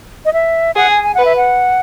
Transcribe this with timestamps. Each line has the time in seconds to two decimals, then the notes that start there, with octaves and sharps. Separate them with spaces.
0.25 D#5
0.33 E5
0.76 G#4 F#5
0.91 G#5
1.04 G#5
1.15 B4 F#5
1.25 E5
1.36 F#5